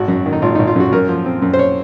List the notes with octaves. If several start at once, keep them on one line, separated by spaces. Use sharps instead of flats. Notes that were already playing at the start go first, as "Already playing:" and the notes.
Already playing: G#1 F#4
F#2
D#3
D#4
G#1 F4
G#1 D#4
F4
F#2 F#4
F#2 A#4
F3
C4
F#2
C5
C#5